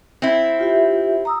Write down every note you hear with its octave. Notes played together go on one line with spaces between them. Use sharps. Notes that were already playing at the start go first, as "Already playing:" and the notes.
C4 E4
F4 G4 E5
A#5 D#6 E6